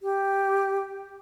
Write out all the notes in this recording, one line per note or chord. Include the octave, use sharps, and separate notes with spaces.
G4